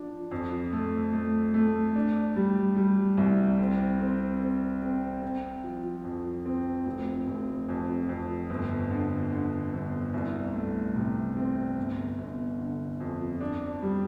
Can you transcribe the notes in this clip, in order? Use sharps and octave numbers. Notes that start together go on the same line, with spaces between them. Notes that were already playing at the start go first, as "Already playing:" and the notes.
Already playing: F3 D4
F2
A3
A3
A3
D4
G3
G3
C2
C4
C4
C4
C4
C4
F3
F2
C4
F1
F1
F2
F2
G1
D3
D3
G1
C2
A3
C3
C4
G1
G1
D3
F2
D4
G3